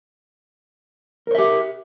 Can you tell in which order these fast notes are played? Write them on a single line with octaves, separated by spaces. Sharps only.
A#4 C#5 E5 G4